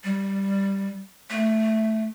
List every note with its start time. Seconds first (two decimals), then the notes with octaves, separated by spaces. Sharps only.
0.04 G3
1.30 A3